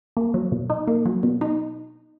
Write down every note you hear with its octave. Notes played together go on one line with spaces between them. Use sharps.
A#3
F#3
B2
D#4
A#3
F#3
B2
D#4